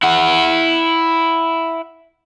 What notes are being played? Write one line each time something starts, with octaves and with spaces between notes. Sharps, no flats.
E4 F#5